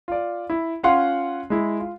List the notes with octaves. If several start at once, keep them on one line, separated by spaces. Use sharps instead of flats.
F4 D5
E4
C#4 F4 F5 F#5 C6
G#3 E4
F4